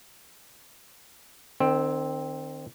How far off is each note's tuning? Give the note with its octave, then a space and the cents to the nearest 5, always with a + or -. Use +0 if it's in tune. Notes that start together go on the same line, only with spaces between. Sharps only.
D#3 -40 C4 +0